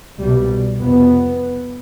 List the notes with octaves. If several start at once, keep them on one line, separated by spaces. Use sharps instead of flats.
C2 B2 G3
F2 C3 B3